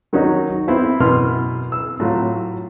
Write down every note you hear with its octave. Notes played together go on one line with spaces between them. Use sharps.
D#3 F#3 C#4 D#4 F#4
B3 C4 E4
F#2 B2 E3 C6 F6
E6
A2 F#3 F4